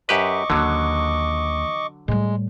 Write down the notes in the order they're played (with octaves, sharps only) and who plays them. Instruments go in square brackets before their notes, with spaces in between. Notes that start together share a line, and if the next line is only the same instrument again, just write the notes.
[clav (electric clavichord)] F#2 G4 B4 [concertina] D#5 C#6 D6
[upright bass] D#2 [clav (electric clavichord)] D3 F#3
[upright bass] A2 G3 [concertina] G#3